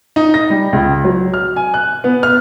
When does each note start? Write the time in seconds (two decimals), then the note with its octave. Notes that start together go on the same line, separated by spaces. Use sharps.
0.16 D#4
0.34 A#6
0.50 G3
0.73 C#2
1.04 F#3
1.34 F6
1.56 G#5
1.74 F#6
2.04 B3
2.23 F6